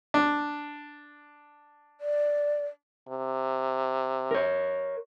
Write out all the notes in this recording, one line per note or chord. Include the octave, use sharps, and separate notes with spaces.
D4
D5
C3
A#4 C#5